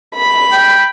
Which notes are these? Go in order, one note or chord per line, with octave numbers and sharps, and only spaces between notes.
B5
G5